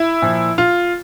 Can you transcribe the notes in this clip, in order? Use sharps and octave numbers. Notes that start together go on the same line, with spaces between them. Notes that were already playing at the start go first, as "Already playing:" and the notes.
Already playing: E4
A#2 F3
F4